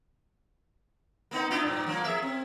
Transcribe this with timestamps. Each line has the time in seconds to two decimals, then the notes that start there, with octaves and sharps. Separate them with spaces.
1.31 A#3 B3 D#4
1.50 D4 E4 F4
1.63 G2 A#2
1.86 F3 A#3
2.04 G#4 A#4 E5
2.22 C4